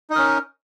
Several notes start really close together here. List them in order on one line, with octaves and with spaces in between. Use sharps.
D#4 D#5 A#4 C#4